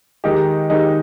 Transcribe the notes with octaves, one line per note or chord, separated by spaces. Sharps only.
D#3 G#3 D#4 G4
D#3 G#3 D#4 G4